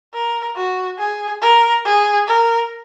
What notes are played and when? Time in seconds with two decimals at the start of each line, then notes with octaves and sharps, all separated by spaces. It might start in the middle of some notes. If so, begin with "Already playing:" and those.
0.14 A#4
0.56 F#4
0.99 G#4
1.41 A#4
1.85 G#4
2.27 A#4